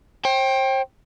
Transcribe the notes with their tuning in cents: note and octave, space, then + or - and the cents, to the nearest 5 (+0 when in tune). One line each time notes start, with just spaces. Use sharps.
C5 +40 G5 +0